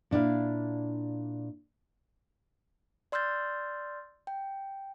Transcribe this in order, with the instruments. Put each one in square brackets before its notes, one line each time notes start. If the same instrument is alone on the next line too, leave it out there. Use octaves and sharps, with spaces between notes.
[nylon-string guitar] A#2 D4 E4 F5
[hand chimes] D5 C6 E6 F6 G6 A6
G5